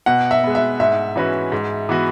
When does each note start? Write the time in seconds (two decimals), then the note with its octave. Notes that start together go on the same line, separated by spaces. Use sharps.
0.06 B2 F#5
0.31 E5
0.44 G#3 B3
0.55 E5
0.80 G#2 E5
1.16 E3 C#4 F#4 B4
1.52 G#2
1.89 E3 B3 F#4